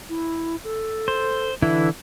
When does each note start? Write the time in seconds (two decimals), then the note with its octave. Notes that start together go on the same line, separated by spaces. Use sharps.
0.09 E4
0.64 A4
1.08 C5
1.62 D3 E3 E4